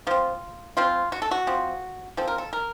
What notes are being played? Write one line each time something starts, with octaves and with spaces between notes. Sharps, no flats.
F3 C4 F4
F3 C4 F4
F#4
A4
F#4
F3 C4
F3 C4 A4
A#4
A4
A#4